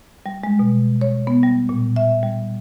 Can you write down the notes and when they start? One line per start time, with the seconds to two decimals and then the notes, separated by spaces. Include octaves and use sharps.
0.26 G3
0.44 G#3
0.59 B2
1.01 C#5
1.27 B3
1.43 G3
1.69 A#2
1.96 E5
2.23 G3